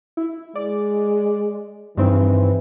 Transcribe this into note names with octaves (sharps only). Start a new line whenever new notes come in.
E4
G#3 D5
G2 D#3 E3 C4